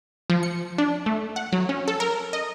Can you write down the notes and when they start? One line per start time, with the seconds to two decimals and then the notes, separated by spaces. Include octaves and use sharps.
0.30 F3
0.43 C#7
0.78 D4
1.06 A3
1.36 F#5
1.52 F#3
1.69 C#4
1.88 A4
2.00 A#4
2.33 D#5